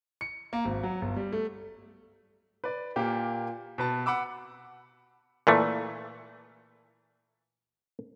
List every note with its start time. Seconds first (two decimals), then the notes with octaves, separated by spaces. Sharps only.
0.21 C#7
0.53 A#3
0.65 G#1
0.83 F#3
1.01 G1
1.16 G3
1.32 A3
2.64 B4 D5
2.96 A#2 A#3 G4
3.78 B2 B4 A5
4.06 F#5 B5 D6 E6
5.47 A#2 E3 A3